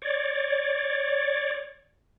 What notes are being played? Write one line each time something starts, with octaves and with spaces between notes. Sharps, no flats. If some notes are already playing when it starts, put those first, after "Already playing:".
C#5 D5